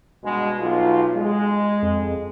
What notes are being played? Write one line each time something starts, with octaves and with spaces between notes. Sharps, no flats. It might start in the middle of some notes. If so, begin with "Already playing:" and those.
G2 B2 G#3
B1 F4
G#3
F2